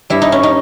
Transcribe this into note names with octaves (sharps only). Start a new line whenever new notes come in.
G2 G3 E4
D#4
C#4
D#4